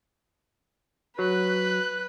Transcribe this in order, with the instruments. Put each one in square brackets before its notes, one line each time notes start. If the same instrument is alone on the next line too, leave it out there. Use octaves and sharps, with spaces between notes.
[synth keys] F#3 [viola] B4 [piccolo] F#6